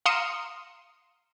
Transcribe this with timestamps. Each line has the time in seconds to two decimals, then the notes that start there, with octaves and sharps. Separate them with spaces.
0.06 F5 A#5 C6 D#6 C#7 E7